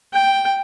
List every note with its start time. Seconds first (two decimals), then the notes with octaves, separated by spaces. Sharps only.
0.13 G5